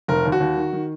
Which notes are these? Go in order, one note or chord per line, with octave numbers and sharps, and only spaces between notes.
F1 A#4
D#2
F#4
D#2
D#3
D#3